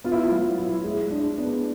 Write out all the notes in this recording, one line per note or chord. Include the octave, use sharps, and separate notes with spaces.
B3 F4
E4
F4
F#3
E4
G#3
D4
B3